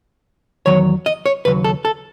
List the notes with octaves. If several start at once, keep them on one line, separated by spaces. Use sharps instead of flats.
E2 D#3 F#3 C#5
D#5
C#5
D#2 C#3 F#3 B4
A4
A4